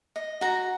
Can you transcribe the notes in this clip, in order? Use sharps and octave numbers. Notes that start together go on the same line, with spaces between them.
D#5
F#4 A#5